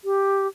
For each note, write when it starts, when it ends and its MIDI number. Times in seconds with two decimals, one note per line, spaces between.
0.05 0.47 67